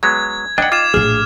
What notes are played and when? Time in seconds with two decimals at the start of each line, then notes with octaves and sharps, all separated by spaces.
0.03 F#3 G#3 B3 G#6
0.58 D4 D#4 D#5 F#5 G5
0.72 F4 D6 G#6 E7
0.94 A#1 A2 G#4 F6